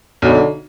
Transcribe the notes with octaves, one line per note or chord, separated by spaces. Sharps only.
B1 D3